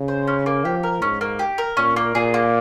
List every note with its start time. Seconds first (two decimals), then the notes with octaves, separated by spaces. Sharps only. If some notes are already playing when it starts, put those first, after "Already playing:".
Already playing: C#3
0.08 C5
0.28 C#4
0.46 A#3
0.65 F3 G4
0.83 A#4
1.02 G#2 C#4
1.21 A#3
1.39 G4
1.58 A#4
1.77 A#2 C#4
1.96 A#3
2.15 A#2 G#4
2.34 A#3